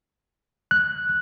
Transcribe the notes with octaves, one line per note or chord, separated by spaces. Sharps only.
F#6